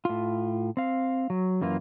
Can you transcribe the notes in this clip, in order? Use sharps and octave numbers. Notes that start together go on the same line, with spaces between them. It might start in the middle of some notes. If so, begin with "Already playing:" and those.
A2 F4
C4 F5
F#3
F#2 E3 A#3 F4